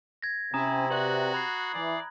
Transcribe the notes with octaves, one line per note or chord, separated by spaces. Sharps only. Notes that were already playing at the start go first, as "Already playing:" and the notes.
G#6 A#6
C3 C#4 E4 G#5 A#5 D#6
F#4 B4 D5 E5 F#6 F#7
B5 D#6 G#6 C7
E3 D5